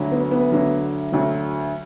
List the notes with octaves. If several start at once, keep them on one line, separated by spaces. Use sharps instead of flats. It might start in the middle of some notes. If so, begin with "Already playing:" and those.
Already playing: D2 D3 F#3
B3
B3
D2 D3 F#3
D2 D3 F#3